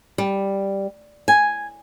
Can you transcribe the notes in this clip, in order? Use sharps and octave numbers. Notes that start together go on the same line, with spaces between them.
G3
G#5